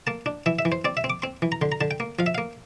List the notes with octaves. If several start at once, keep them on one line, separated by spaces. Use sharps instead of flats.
A#3 A5
D4
E3 E5
E5
E3
C5
C4 D5
E5
C4
D6
C4 C6
E3
A#5
D3 C6
A#5
D3 A5
G5
A#3
F3 F5
E5
A#3 F5